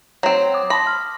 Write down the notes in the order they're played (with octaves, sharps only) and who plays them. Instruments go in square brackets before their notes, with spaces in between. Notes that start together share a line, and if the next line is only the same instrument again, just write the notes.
[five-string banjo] F#3 C4
[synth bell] D6 D#6
[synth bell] A5 C6 A#6 [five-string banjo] B5
[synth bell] F6